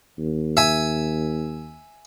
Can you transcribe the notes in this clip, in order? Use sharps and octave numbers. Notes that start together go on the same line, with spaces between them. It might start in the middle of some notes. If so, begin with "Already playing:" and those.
D#2
E5 G#5